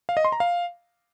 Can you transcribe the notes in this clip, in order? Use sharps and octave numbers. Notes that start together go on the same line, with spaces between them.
F5
D#5
C6
A#5
F5